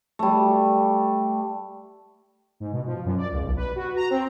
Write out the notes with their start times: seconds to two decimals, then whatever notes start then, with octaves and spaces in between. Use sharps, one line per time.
0.19 G3 A3
2.60 G#2
2.72 B2
2.86 F3
3.05 F#2
3.18 D5
3.32 C#2
3.43 B1
3.57 B4
3.76 F#4
3.96 A#5
4.10 C4